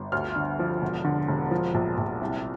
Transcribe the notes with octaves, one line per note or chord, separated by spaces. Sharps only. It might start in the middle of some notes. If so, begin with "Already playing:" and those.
Already playing: G1
D2 F6
D3
F3
E1
D3
E1
F3
A#1
A#1
C2